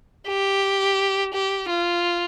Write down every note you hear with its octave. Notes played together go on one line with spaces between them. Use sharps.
G4
G4
F4